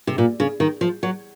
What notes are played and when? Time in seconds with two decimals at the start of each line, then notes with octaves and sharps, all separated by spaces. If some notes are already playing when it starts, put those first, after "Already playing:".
0.07 C3
0.18 A#2
0.40 C#3
0.60 D#3
0.81 F3
1.03 F#3